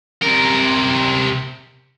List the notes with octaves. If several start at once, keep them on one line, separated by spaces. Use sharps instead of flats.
C3 A#4